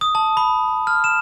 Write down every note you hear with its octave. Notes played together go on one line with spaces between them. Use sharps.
D#6
A5
B5
F6
E7